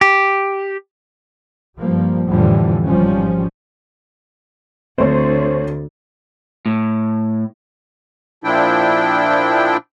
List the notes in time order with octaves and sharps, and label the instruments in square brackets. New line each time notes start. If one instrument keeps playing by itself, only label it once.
[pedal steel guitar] G4
[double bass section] G2 F3 G3 A#3
F2 A2 D3 E3 F3 G3
G#1 F3 G3 C#4
[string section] D2 [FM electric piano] A3 C4 [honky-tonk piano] C5 C#5
[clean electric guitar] A2
[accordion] A#2 F3 D4 E4 G5